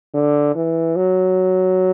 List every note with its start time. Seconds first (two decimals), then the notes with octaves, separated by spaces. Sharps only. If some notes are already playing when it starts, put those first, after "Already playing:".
0.14 D3
0.55 E3
0.96 F#3